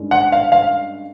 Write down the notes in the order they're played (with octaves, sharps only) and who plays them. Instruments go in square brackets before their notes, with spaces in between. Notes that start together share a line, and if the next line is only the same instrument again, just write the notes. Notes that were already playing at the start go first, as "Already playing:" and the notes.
Already playing: [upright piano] G2 D#3 G#3 C#4
F#5
F5
F5